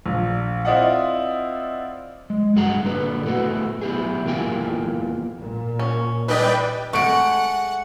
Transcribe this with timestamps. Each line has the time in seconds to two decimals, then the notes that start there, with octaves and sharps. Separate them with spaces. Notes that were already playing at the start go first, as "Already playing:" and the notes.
0.06 A#1
0.65 C4 E4 F4 D5 D#5 F#5
2.30 G#3
2.56 G2 F#4 G#4 F#5 A#5
2.85 D3 A#3 B4
3.25 A2 A3 B3 F#4
3.81 B3 E4 G4 G#4
4.25 E2 E3 A#3 F4 G5 G#5
5.40 A#2
5.79 C#4
6.28 E3 G3 B4 D5 D#5 G5
6.93 G#3 A3 F#5 C#6 D7